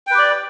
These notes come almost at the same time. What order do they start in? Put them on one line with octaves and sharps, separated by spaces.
G5 B4 G4 D5